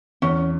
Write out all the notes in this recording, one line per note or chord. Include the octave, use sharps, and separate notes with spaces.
E2 C#4